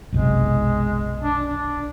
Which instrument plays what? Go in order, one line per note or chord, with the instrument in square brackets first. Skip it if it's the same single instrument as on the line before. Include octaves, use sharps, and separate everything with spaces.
[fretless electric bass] F#1 B1 C3 [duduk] G#3
[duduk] D4
D4